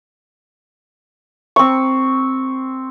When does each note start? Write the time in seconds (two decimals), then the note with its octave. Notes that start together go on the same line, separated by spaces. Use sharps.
1.56 C4 C#6